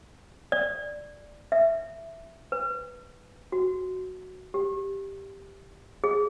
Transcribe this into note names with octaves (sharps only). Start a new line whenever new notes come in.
D5
E5
B4
F#4
G4
G#4